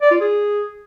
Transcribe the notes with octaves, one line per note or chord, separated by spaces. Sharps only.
D5
F4
G#4